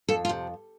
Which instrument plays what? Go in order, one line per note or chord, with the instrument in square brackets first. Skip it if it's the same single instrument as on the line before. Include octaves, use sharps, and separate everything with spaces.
[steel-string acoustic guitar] F2 A4
F4
C3